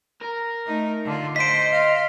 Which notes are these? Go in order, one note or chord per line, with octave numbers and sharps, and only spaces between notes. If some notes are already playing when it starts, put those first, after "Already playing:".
A#4
A3 D#4
D3 F4
C5 D#5 B6 D7
F5